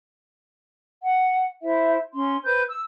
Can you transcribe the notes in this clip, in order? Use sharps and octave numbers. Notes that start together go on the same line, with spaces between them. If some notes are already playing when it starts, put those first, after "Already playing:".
F#5
E4 C5 E5
C#4 C6
B4 C5 G6
E6